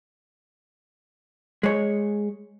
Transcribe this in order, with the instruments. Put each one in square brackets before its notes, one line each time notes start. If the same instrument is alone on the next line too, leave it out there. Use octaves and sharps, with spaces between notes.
[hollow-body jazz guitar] G#3 C#5